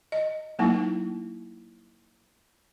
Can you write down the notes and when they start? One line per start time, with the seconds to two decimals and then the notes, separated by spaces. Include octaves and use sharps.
0.12 D#5
0.59 F#3 A3 A#3 D#4 E4